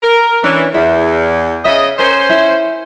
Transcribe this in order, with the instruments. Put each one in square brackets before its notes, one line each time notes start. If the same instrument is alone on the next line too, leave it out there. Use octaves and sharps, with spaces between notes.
[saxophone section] A#4
[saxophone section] E3 [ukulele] C#4 D4
[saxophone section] E2 [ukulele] E4
[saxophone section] C#3 D#5 [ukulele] E5
[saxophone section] C#4 C5 [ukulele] A#4
[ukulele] E4